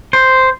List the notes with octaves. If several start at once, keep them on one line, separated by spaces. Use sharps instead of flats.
C5